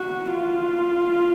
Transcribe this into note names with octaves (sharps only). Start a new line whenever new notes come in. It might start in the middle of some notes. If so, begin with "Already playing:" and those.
Already playing: F#4
F4